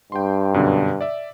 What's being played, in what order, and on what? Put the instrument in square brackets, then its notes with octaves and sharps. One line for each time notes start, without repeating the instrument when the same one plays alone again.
[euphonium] G2 [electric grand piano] G5 C6
[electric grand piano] F#2 B2 D3
D5 E5